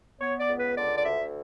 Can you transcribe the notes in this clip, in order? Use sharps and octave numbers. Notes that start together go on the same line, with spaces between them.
B3 C#5
D5
C#2
B4
D3 D5
D5
D2 E5